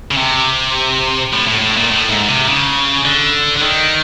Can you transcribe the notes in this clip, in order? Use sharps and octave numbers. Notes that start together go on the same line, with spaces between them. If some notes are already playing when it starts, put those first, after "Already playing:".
C#3
C3
A2
A2
A2
A#2
A2
G#2
C3
C#3
D3
D3
D#3